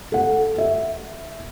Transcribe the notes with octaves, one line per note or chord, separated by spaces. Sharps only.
A4 F#5
E5